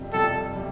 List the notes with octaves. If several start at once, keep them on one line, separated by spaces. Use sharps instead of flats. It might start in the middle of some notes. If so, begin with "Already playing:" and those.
Already playing: F2 C3 G3
F2 C3 G3 A4
C3 G3